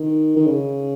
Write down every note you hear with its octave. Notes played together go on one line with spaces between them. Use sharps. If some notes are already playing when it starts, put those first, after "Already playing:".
Already playing: D#3
D#3
C#3